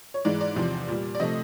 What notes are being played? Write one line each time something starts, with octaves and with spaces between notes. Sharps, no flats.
C#5
G#2 E3 G#3 D5
D5
E2 C3 F3
A#2 G3
D5
C3 F3 A3 D#5